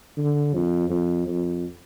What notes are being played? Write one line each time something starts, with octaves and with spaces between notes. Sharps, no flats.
D3
F2
F2
F2